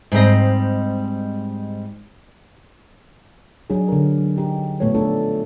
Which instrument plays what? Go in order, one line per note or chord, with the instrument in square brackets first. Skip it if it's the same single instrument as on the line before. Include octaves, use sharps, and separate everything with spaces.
[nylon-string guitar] G#2 G3 C4 D#5
[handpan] F#3 D4 D#4 G#4
D3 A#4
F#3
D#4 G4
A#2 F3 A3 B3 A4 C#5
A3 D4 D#4 A4